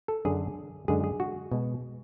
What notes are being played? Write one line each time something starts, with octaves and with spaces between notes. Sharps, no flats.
A4
F#2 D3 F#3 G#4
F#2 D3 G#3 G#4
G#4
F#4
B2 G#3